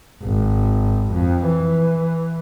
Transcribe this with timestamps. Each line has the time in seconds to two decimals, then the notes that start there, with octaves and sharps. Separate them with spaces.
0.23 G#1
1.13 F2
1.47 E3